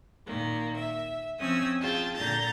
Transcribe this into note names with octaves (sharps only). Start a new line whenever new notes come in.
A#2 D#3 A#3
E5
F3 C4 C#4 G#5 D#6 E6
F4 G#4 G5 A5
A#2 D3 A#5 G6 A6